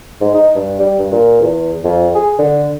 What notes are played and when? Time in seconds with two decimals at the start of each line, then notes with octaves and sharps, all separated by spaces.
0.21 G#2
0.34 D#4
0.55 G2
0.79 G3
0.99 G2
1.12 A#2
1.41 E2
1.84 F2
2.15 G#4
2.39 D3